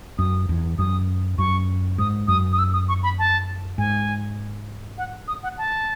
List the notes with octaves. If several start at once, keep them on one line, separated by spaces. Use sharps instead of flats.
F#2 D#6
E2
F#2 D#6
F#2 C#6
G#2 D#6
F#2 D#6
D#6
E6
D#6
C#6
B5
A5
G#2 G#5
F#5
D#6
F#5
A5